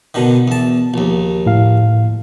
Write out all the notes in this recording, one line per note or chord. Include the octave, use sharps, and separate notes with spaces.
B2 D3 D#3
E2 A5
A#1 D#2
A2 F5